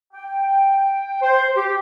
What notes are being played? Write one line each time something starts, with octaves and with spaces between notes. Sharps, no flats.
G5
C5
G4